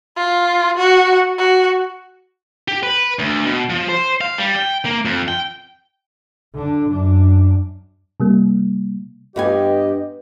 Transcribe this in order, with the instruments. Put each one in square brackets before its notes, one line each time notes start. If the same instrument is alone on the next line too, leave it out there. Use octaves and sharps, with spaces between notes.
[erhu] F4
F#4
F#4
[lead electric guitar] G4
B4
D2
B2
F3
C5
F5
G3
G5
A#3
F2
G5
[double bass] D3 D4
F#2 D4
[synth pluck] C3 G3 A#3
[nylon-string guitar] G2 B3 G#5 [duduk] G4 [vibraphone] B4 [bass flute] D#5